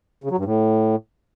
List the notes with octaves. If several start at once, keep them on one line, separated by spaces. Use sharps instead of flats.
C#3
F#3
G2
A2